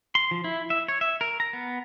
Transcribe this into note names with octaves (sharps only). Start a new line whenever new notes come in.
C6
F3
E4
E5
C#5
E5
A#4
A#5
B3